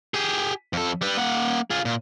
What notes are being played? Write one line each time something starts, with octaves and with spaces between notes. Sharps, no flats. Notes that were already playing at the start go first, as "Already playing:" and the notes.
G4 G#4
F2 A4
G3 B4
A#3 F#5
F4 G#4
A#2